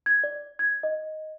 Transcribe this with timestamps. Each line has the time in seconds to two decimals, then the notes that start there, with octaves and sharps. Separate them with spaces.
0.06 G#6
0.24 D5
0.59 G#6
0.83 D#5